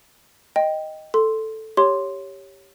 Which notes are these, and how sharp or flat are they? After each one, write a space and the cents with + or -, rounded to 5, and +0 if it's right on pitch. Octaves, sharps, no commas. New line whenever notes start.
D#5 +0 G5 +0
A4 +0 C6 +0
G4 +0 C#5 +0 C6 +0